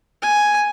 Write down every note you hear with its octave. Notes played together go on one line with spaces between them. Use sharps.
G#5